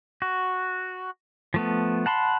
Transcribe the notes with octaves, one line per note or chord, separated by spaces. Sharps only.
F#4
F3 A3 B3
F#5 A5 B5 C6